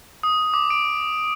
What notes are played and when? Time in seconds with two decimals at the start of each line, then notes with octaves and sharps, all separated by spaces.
0.23 D#6
0.54 D6
0.70 D7